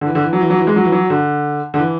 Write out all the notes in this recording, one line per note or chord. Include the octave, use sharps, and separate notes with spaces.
D3
E3
D3
E3
F#3
E3
F#3
E3
G#3
F#3
E3
F#3
D3
D3
E3